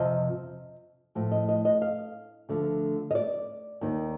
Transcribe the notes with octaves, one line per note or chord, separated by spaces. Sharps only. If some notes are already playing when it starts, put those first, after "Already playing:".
Already playing: F2 C3 F3 D#5
A2 F3
D#5
D#5
D#5
F5
D2 D3 F3
D#5
D5
D#2 D#3